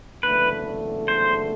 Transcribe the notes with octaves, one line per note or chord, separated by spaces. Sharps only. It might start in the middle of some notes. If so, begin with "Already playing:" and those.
F#1 E2 D3 A3 B4
C5